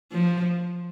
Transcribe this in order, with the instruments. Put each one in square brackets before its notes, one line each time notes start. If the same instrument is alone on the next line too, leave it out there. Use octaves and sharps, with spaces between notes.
[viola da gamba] F3